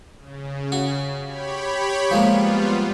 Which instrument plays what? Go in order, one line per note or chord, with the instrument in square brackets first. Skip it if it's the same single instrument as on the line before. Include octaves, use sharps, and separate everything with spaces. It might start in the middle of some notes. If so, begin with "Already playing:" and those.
[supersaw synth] C#3
[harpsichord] F#4
[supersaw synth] G4 C#5 B5
[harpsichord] F3 G#3 A#3 [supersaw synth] G3 B3 F4